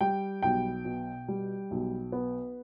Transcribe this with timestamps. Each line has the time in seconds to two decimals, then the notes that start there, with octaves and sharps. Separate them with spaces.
0.01 G3 G5
0.43 B1 G5
0.85 B2
1.28 G3
1.71 B1
2.12 B3